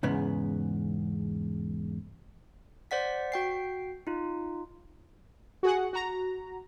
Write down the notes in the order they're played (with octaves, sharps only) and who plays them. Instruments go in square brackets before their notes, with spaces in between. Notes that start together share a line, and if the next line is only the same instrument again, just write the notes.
[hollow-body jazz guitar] E2 G#2 C#3 B3
[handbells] C5 D5 F#5 B6
F#4 G5 C7
D#4 F4
[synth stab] F#4 G#4 F#5
F#4 A#5